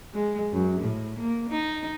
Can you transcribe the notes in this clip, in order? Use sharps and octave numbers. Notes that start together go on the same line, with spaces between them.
G#3
F#2
A2
A#3
D#4